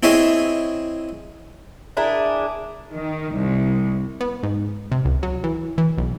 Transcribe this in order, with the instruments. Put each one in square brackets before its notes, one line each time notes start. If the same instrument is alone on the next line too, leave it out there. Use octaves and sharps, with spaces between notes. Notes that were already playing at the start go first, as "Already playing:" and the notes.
[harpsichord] C4 E4 G#4 C#5 D#5 E5
[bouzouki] D4 E4 G#4 A#4
[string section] D#3
C2
[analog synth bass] B3
G#2
C3
C#2
F#3
E3
E3
B1